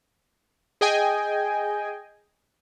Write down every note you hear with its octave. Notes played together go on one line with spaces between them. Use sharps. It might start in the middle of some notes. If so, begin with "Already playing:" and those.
G#4 D#5 G5 G#5